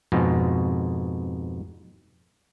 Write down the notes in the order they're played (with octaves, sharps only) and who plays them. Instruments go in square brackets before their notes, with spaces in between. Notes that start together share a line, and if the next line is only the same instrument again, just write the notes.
[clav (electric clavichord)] F2 G#2 B2